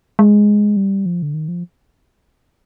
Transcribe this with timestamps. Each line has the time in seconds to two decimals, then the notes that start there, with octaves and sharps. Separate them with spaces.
0.19 G#3
0.77 G3
1.06 F3
1.22 D3
1.34 D#3
1.48 F3